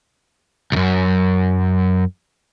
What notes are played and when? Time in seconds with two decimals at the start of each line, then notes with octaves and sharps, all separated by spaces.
0.72 B1 F#2